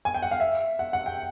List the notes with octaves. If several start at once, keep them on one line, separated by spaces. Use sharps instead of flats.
G#5
G5
F#5
F5
E5
F#5
F#5
G5